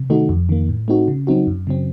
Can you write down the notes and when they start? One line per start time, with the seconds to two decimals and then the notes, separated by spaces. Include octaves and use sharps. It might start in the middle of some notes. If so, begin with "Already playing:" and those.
Already playing: C3
0.10 D#3 A3 D#4 F#4
0.29 F2
0.49 D#3 A#3
0.69 A2
0.88 A3 C4 D#4 F#4
1.08 C#3
1.27 F#3 C4 D#4 F#4
1.47 F#2
1.67 C#3 F#3 C4